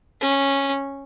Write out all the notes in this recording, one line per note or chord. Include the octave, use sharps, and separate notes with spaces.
C#4